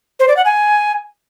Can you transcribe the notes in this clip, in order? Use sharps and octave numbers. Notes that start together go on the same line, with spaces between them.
C5
D5
F#5
G#5